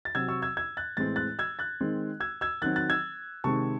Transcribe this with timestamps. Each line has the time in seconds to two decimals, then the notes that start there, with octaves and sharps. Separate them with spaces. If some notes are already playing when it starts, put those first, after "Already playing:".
0.05 A6
0.15 C3 F#3 C4 E6 G#6
0.28 C#6 E6
0.42 E6 G#6
0.57 E6 G#6
0.77 F#6 A6
0.97 A2 E3 G#3 C4 A6
1.16 F#6 A6
1.39 E6 G#6
1.59 F#6 A6
1.80 D#3 G#3 C4
2.20 E6 G#6
2.41 E6 G#6
2.62 D#3 F#3 C4 F#6 A6
2.76 F#6 A6
2.90 E6 G#6
3.44 C3 D#3 G#3 C4 A5 C#6